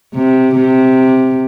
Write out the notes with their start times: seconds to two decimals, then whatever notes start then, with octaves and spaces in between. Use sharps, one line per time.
0.14 C3
0.56 C3